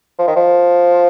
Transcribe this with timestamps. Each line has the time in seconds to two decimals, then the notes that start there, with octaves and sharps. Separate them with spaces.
0.19 F3
0.28 D#3
0.36 F3